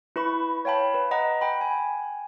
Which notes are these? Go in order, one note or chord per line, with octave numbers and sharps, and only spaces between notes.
E4 B4 B5 C#6
C#5 F5 G5 A5 B5
B4
D#5 F#5 A#5
F#5 G5 B5
G5 G#5